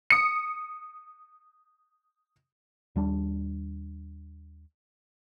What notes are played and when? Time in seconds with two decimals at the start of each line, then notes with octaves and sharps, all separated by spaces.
0.10 D#6 C#7
2.96 D#2 G3 D4